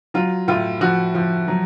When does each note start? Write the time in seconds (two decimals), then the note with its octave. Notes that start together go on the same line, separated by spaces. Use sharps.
0.14 F#3 F4
0.48 A2 F4
0.81 F3 F#4
1.15 F3
1.48 F#3